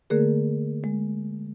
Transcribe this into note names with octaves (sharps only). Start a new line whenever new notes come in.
D3 A3 A#3 G#4 A#4
G#3